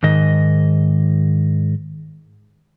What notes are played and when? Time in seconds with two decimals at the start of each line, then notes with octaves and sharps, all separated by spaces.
0.03 G#2 D#3 D#5